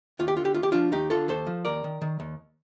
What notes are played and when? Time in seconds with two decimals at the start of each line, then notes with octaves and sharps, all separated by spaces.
0.19 D#2 F4
0.28 G4
0.37 D3 F4
0.45 G4
0.54 D#2 F4
0.63 G4
0.72 F3 D4 F4
0.92 D#2 D#4 G4
1.10 D3 F4 A4
1.28 D#2 A4 C5
1.47 F3
1.65 D#2 A#4 D5
1.84 D#3
2.02 D#3
2.20 D#2